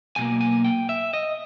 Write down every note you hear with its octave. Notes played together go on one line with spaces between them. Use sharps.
B1 B2 A#3 G#5
G#5
G5
E5
D#5